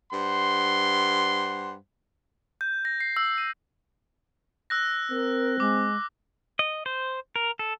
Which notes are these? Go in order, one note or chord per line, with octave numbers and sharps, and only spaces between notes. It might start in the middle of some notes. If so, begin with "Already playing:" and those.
G2 C5 F#5 C6
G6
A#6
C7
E6
D#7
E6 F#6 A#6
C4 A#4
G#3 D6
D#5
C5
A#4
A4